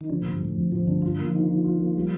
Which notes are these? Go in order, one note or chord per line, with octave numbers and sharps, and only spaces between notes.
D#3
D3 F3
A#2 D3
G2
A2 A3
F2
A2 F3
G2 D3
G2 F4
A#3
F3
D#3
D#3
F4
A#3
G3